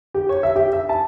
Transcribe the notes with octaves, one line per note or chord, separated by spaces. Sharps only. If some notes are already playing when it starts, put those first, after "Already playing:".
G4
C#5
E5
G4
E5
A5